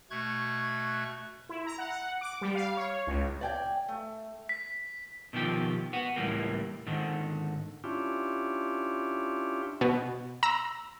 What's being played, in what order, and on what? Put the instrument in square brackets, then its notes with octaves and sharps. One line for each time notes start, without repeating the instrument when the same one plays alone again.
[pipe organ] B2 A3 C#6 F#6 G#6
[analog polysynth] E4
A#5
F#5
F#5
D6
G3
F5
C#5
C#2
[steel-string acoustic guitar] D5 G5 G#5
A3
[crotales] B6
[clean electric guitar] B2 D#3 F3 G4
B3 F#4
C#2 A2 E3 G3 A#3
G#2 D3 D#3
[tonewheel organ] C#4 D4 E4 F4 G4
[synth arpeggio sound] B2
A#5 E6